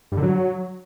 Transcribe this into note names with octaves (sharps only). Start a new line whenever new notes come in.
G2
D3
F#3